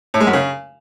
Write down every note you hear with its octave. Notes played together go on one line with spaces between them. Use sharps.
A2
G#3
F#2
C#3